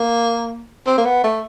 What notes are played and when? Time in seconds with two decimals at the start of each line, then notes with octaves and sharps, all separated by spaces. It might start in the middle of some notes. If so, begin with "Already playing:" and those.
Already playing: A#3
0.86 C4
0.98 A#3
1.05 B3
1.24 A3